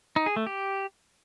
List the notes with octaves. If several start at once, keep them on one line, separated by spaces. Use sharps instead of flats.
D#4
G#4
A3
G4